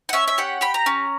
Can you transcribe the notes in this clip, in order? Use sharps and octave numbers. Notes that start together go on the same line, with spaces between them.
F#5
C#4 E5
E5
G4 F#5
G4 B5
A#5
C#4